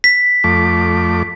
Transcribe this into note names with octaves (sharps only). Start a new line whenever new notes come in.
B6
F2 A3 D6